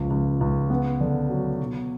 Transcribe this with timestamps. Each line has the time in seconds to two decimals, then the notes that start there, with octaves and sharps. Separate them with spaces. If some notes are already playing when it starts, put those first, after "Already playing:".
Already playing: C#2 F3
0.10 C#2
0.41 C#2
0.70 B3
1.01 D3
1.30 F#3
1.60 B2